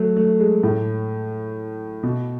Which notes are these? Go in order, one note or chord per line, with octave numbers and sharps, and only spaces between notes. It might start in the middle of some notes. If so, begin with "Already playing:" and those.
Already playing: F#3 A3
A3
G#3
A2
B2